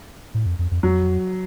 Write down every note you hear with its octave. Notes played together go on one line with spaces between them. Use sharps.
A2
F2
F2
F2
F2 F#3